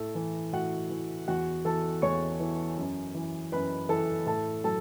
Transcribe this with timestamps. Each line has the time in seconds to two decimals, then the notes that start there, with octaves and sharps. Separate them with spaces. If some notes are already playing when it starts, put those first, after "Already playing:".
Already playing: A2 A4
0.15 E3
0.53 A2 F#4 F#5
0.90 E3
1.28 E2 F#4 F#5
1.65 E3 A4 A5
2.02 E2 C#5 C#6
2.40 E3
2.77 F#2
3.15 E3
3.52 F#2 B4 B5
3.89 E3 A4 A5
4.26 A2 A4 A5
4.64 F#3 A4 A5